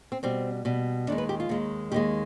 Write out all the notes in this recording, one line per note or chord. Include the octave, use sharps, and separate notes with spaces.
C4
B2 G3 C4
B2 G3
D#2 D#3 G#3 D4
B4
G4
F4
D#2 D#3 G#3
D#2 D#3 G#3 G4